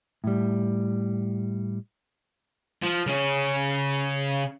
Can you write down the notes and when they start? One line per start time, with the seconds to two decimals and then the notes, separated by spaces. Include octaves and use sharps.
0.24 A2 G3
2.82 F3
3.06 C#3 C#4